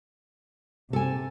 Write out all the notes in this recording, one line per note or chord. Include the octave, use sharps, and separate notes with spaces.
C3 A4 G#5